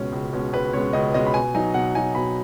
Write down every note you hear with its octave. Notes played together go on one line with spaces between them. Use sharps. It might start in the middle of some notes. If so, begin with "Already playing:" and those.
Already playing: C#2 B2 G#3 C#4 C#5
C#2
B2 G#3 C#4
C#2 B4
B2 G#3 C#4 C#5
C#2 D#5
B2 G#3 C#4 D#5
B5
B2 G#5
F#3 D#4 G#5
B2 F#5
F#3 D#4 G#5
B2 B5